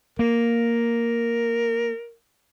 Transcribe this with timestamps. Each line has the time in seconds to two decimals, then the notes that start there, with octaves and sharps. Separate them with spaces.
0.19 A#3 A#4